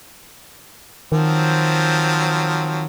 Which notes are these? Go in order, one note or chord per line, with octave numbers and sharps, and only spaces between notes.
D#3 F3 F#3 C4